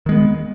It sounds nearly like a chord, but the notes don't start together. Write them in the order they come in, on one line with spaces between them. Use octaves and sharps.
D#3 G#3 B3